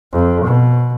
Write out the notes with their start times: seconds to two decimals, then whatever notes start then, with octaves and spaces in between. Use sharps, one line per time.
0.12 F2
0.45 B2